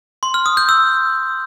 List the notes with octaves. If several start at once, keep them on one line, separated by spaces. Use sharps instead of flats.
C6
F6
D#6
G6
E6